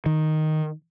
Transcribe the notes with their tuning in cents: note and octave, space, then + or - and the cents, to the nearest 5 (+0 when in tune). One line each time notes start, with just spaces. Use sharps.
D#3 +0